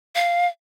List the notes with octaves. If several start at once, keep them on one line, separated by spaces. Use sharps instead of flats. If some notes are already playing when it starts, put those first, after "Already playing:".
F5